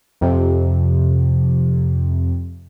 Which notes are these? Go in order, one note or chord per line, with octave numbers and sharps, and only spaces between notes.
F2 C3